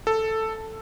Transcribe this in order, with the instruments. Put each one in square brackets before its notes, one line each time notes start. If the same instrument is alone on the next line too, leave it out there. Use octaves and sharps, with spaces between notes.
[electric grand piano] A4